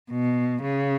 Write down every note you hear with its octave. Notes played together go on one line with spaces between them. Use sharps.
B2
C#3